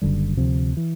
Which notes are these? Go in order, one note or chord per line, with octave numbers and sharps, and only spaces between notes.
F#1 F#2 D3 G3
D2 C3 F3
E3